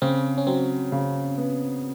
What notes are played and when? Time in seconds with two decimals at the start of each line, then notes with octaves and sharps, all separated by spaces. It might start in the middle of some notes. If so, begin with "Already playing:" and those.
0.02 C#3 C4
0.38 C#4
0.47 F#3 C4
0.92 C#3
1.38 B3